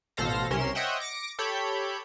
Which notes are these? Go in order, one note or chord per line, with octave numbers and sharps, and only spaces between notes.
A1 B2 A4 C5 F5 A#6
C2 C3 C#4 A#4 C6 E7
C5 C#5 D#5 E5 F#5 G5
D6 A#6 C#7 D7
G4 A4 C#5 B5 G6